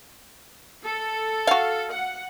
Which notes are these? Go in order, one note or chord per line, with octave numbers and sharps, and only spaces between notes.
A4
F#4 F5
F#5